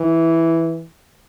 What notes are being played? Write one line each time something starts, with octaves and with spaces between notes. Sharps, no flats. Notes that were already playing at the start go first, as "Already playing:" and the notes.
Already playing: E3